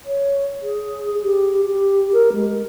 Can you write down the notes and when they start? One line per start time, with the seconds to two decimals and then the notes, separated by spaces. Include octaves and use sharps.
0.06 C#5
0.62 G#4
1.23 G4
1.65 G4
2.13 A#4
2.33 G#3